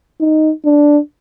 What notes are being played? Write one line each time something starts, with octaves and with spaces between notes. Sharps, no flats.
D#4
D4